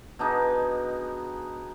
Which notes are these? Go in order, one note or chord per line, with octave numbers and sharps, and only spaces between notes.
B2 D4 D#4 G#4